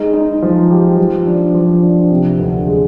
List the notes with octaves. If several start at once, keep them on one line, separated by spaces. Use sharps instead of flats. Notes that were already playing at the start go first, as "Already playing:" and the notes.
Already playing: G#3 D#4
D#4
F3
G4
F3
D4
F3
D4
C3
D2
G#3